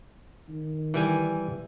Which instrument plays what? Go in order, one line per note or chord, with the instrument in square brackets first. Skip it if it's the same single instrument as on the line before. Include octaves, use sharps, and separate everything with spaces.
[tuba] D#3
[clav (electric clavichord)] E3 G3 G#5